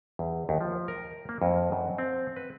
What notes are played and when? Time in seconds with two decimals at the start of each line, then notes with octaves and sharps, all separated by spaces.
0.19 E2
0.49 D#2
0.61 F3
0.88 A#4
1.29 A#3
1.42 F2
1.72 F#2
1.98 C4
2.36 B4